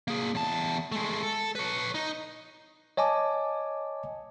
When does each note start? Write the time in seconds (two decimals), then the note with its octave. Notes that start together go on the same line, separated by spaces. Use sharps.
0.08 A#3 G#4
0.35 E2 A5
0.92 G#3 A3
1.23 A4
1.55 B4 C#5
1.95 D#4
2.97 C#5 D#5 G#5 A5 D6